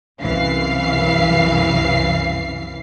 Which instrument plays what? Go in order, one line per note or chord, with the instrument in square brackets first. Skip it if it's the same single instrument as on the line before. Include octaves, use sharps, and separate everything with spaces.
[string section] C2 F#2 E3 F5 C7